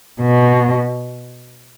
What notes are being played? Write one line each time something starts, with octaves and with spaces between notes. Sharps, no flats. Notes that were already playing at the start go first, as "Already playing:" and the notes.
B2